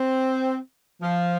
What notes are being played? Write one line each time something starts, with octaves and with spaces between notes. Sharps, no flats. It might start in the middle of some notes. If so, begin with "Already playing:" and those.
Already playing: C4
F3